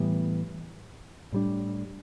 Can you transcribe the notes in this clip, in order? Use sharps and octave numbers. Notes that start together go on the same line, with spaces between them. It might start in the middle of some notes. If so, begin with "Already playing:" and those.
Already playing: A2 E3 G3 B3
A2 G3 D4